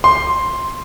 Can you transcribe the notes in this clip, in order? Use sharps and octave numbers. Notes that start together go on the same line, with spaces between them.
C6